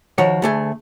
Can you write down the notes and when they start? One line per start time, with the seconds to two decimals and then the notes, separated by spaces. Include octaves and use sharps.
0.18 D#3 F3 F#4 C#5
0.42 D2 A3 G#4